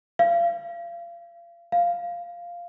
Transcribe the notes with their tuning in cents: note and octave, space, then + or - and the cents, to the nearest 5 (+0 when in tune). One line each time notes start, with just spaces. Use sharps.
F5 -30
F5 -5